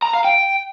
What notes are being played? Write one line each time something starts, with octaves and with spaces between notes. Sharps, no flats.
A#5
F5
G5